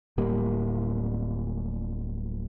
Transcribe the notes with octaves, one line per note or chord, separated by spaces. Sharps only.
D1 A2 G3 A#3